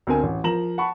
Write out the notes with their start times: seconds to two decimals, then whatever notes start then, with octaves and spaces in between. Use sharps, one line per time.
0.07 D2 C4 A#4 G#5
0.23 A1
0.44 F3 A#4 A#5 E7 F#7
0.78 F#5 A5 B5 C#6